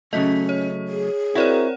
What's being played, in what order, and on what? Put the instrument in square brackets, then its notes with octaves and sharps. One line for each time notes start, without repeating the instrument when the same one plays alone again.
[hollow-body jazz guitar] C#3 F#3 A3 [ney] C#4 [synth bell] D#5 B6
[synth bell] C#5
[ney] G#4
[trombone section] C4 A#4 [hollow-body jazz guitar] E4 F#4 [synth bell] C#5 D5 F#5